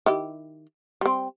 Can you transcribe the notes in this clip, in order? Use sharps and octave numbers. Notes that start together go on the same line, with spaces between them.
D#3 E4 G4
G3 C4